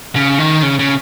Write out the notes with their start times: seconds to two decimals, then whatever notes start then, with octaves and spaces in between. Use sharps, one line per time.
0.16 C#3
0.39 D#3
0.63 C#3
0.79 C#3